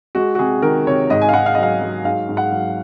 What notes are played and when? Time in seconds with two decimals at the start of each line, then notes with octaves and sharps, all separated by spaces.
0.15 G#3 F#4
0.35 F#4
0.39 C3 G#4
0.62 D#3 A#4
0.87 C3 C#5
1.10 G#2 D#5
1.22 G#5
1.29 F5
1.34 G#2 F#5
1.46 F5
1.55 D#5
1.58 F#3 F5
1.82 F#3
2.05 G#2 F5
2.29 G#2
2.37 F#5
2.52 F#3